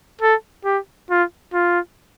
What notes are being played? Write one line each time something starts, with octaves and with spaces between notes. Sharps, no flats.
A4
G4
F4
F4